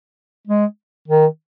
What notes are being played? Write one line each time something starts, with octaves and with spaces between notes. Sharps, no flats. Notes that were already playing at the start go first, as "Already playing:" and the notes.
G#3
D#3